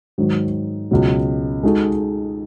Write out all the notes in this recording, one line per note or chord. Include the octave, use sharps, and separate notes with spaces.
G#2 D#3 F#3
C#2 B2 F#3
G#3 D#4 F#4 A4